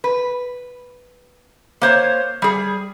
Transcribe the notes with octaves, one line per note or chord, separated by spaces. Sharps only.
B4
A#3 C5 C#5
G3 G#4